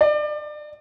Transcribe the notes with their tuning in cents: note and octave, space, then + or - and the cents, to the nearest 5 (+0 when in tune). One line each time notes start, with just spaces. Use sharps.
D5 +30